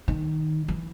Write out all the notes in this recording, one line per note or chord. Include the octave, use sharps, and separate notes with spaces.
D#3
E3